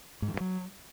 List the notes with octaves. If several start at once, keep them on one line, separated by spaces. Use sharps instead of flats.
G#2
E3
G2
F#3